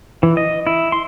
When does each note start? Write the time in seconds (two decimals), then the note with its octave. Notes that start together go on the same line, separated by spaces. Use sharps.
0.23 E3
0.37 D#5
0.67 E4
0.92 C6